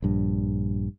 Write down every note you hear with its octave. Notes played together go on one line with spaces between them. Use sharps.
A#1 G2